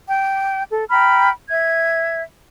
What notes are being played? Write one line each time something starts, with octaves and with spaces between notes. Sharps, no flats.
G5
A4
G5 A#5 B5 F6
E5 G#6